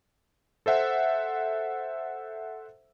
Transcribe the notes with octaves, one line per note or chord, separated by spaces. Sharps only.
A4 C5 E5 F#5